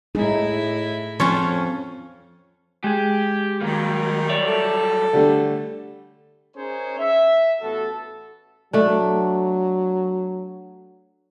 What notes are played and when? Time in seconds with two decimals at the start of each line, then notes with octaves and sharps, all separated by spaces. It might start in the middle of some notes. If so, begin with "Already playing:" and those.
0.15 A2 D#4 E4 G#4
1.20 F2 F3 C#4 F4 C#5
2.84 G#3 G4 G#4
3.61 D#3 F#3 G3 A#3
4.29 C#5 D5 E5
4.47 A4
5.13 D3 G3 A3
6.55 C#4 D#4 G#4 A#4 C5 C#5
6.99 E5
7.61 A1 B3 F#4 A4
8.73 F#3 A3 D4